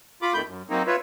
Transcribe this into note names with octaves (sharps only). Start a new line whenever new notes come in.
F4 B5 D6
F2 D#3 A3 B5 G6
F#2
F#3 A#3 C4 D#4
F4 B4 C#5 E5